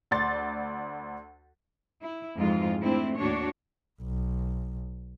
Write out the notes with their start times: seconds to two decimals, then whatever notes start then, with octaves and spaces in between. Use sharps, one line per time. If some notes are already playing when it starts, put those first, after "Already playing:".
0.11 D2 D5 C6 A6
2.01 E4
2.37 F2 G#2 E3 G#3 F4
2.80 A3 C4 D4 E4
3.17 D#2 A2 A3 D4 F#4 C#5
4.02 B1